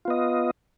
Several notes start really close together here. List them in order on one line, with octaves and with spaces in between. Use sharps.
F4 B3 D#5